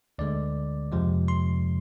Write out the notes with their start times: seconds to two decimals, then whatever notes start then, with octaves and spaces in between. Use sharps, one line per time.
0.18 D2 D3 G#3 D5
0.92 F2 C3 F3 G#3
1.28 C6